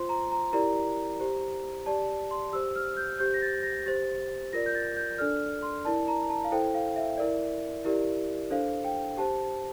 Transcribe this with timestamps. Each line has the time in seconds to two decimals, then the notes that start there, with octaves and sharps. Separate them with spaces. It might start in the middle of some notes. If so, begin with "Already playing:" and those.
Already playing: F4 C5 C6
0.09 A#5
0.32 A#5
0.53 E4 G4 A#4 D5 A#5
1.20 G4 C5
1.86 G4 D5 A5
2.31 C6
2.53 G4 C5 E6
2.76 F6
2.97 G6
3.19 G4 C5 G6
3.34 A#6
3.42 A6
3.63 A#6
3.86 G4 C5 A6
4.53 F4 A#4 D5 A#6
4.66 G6
4.75 A6
4.97 G6
5.18 D4 A4 D5 F6
5.62 C6
5.85 E4 A#4 D5 A5
6.08 A#5
6.30 A5
6.44 F5
6.52 E4 A4 C5 G5
6.75 F5
6.96 E5
7.18 E4 A#4 D5
7.85 E4 G4 A#4 D5
8.51 D4 A4 C5 F5
8.85 G5
9.18 G4 C5 A5